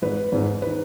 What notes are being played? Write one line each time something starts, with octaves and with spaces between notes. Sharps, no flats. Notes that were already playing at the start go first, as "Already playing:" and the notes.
G#1 G#2 D#3 B4
G#1 G#2 D#3
D#3 B4